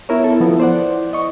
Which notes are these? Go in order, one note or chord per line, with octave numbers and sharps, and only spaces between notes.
B3 E4 A#4 C#5 E5
E4 A4
F3 B3
C5 D5 F#5
D#5 C#6